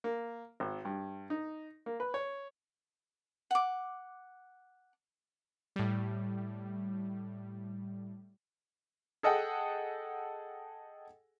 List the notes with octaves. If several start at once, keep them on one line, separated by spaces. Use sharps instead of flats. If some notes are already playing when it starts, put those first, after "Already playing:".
A#3
G#1
G2
D#4
A#3
B4
C#5
F#5 D6
A2 G3
G#4 A4 D#5 F#5 G5